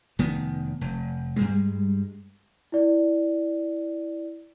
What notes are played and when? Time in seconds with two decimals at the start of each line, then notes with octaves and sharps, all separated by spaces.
0.19 F1 D#3 B3
0.81 F1
1.36 G2 G3 G#3
2.72 E4 D5